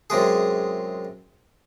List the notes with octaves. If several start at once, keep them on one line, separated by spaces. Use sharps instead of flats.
F#2 C3 G#3 G#4